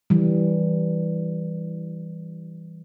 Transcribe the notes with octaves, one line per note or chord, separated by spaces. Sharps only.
E3 G3